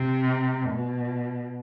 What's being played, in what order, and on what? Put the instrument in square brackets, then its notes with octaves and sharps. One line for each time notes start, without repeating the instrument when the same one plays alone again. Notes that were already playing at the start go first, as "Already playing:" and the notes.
Already playing: [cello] C3
B2